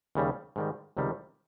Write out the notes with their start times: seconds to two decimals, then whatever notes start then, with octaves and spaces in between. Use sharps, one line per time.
0.15 D#2 C#3 G3
0.56 G#2 D#3 G3
0.97 C#2 C3 D#3 G3